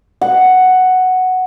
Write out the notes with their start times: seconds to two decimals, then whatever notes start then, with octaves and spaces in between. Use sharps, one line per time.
0.21 F#5